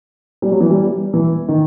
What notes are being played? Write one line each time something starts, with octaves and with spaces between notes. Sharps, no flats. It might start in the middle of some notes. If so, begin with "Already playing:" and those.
G3
F#3
E3
G3
E3
D#3